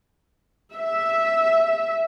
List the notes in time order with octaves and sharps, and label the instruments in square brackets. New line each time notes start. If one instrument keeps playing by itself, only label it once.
[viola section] E5